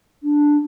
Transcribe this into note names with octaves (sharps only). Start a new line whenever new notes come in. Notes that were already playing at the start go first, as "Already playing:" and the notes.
D4